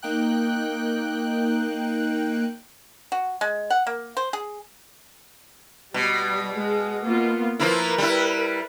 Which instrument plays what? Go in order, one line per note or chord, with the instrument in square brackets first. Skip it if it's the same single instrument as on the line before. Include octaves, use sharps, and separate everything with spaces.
[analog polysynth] A#3 D#4 G5 F#6
[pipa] F#4
G#3
F#5
A#3
C5
G#4
[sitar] B2 [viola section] G3
[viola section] G#3
A#3 B3 F4
[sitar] F3 A#3 E4 [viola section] A#4 B4
[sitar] G3 E4